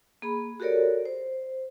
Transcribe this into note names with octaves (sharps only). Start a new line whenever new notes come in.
A#3 G#4 B5
F#4 G4 A4 A#4 C#5 D5
C5